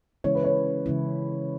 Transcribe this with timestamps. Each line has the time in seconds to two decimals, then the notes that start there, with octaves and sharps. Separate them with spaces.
0.24 C#3 E3 G#3 C#4 E4 C#5
0.35 B4
0.44 C#5
0.86 C#3 E3 G#3 C#4 E4